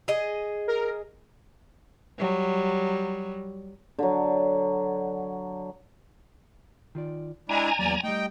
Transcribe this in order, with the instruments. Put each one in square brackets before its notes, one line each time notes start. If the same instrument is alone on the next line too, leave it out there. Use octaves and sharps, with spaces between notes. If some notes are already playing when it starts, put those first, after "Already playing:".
[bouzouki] G#4 D#5
[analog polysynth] A#4
[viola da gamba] F#3 G3
[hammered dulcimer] D3 F#3
[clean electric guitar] D#3 F4 D5
[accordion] G#3 D4 E4 [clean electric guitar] D#5 G5 [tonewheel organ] G#5 A#5
[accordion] E2 D5 [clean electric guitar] F#3 A#3
[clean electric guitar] G3 A3 [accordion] D#4 G5